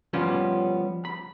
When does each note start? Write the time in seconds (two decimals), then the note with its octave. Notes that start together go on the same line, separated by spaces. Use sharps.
0.13 F3 G3 B3 C#4
1.05 B5